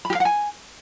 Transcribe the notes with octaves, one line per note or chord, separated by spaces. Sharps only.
B5
G4
F5
F#5
G#5